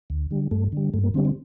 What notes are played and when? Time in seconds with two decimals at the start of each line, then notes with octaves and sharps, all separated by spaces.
0.10 D2
0.31 D3 G3
0.51 G2 A3
0.72 D3 G3
0.94 G2 A3
1.04 A#3
1.14 D3 G3 C4
1.25 C4